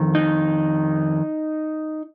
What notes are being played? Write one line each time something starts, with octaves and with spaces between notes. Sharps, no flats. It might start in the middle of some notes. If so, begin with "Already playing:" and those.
Already playing: F2 D#3
D#4